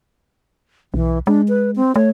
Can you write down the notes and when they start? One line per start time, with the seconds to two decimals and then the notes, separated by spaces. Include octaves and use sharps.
0.94 B1 E3
1.27 G#3 D4
1.49 B4
1.76 C4
1.96 A3 C#5